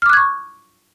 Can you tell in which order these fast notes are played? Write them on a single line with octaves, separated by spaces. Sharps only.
F6 D6 F#6 G#6 C#6